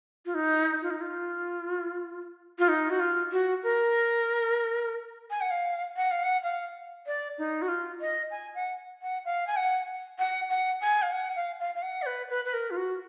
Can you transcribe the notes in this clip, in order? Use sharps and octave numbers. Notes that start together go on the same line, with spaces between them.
F4
D#4
F4
D#4
F4
F4
D#4
F#4
F4
F#4
A#4
G#5
F#5
F5
F#5
F5
F#5
F5
D5
D#4
F#4
F4
D#5
G#5
F#5
F#5
F5
G#5
F#5
F#5
F#5
G#5
F5
F#5
F5
F5
F5
F#5
D5
B4
B4
B4
A#4
F4
F#4